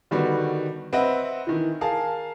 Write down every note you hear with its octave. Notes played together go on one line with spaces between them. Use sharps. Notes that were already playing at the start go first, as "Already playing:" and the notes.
D3 D#3 G3 B3 F#4
C4 B4 D#5 E5 F#5
D#3 E3
G#4 A#4 F5 A5